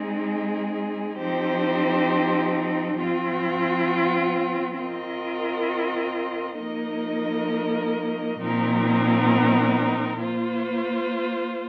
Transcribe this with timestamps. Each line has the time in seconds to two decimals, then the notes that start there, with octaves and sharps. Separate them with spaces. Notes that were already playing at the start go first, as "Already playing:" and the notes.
Already playing: G#3 C4 D#4 G#4
1.18 F3 C4 D#4 G4 C5
2.98 F3 C4 F4
4.79 C4 F4 A#4 D#5
6.60 F3 A#3 D#4 A#4 D#5
8.39 A#2 F3 C4 D#4 A#4
10.21 A#3 F4 C5